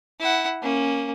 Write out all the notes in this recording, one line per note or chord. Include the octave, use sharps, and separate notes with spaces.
E4 F#5
A#3 C#4